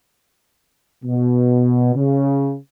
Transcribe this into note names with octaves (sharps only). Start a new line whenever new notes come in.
B2
C#3